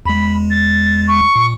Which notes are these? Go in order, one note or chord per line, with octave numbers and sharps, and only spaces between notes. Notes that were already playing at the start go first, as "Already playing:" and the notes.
E2 G#3 B5
A6
C#6
A#2